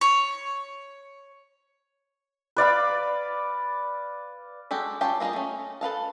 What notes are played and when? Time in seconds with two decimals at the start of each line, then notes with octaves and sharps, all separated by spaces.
0.01 C#5
2.57 B4 D5 F5 B5
4.71 G#3 F#4 G4 A4
5.01 C#4 F4 G4 G5 A5
5.20 A#3 C4 F4 G#4 D#5
5.33 A3 C#4
5.81 A4 B4 F5 A5